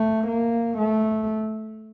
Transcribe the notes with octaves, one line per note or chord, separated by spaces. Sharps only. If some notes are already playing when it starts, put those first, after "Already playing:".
Already playing: A3
A#3
A3